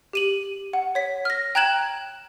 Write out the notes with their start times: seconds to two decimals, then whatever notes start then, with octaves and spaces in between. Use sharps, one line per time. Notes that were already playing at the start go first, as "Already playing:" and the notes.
0.13 G4 D#7 F#7
0.73 F#5
0.95 C#5 B6
1.25 F6 A#6
1.55 G5 A#5 F#6 G#6 E7 F#7